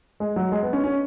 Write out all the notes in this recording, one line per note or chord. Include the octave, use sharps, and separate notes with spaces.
G#3
F#3
G#3
B3
C#4
C#4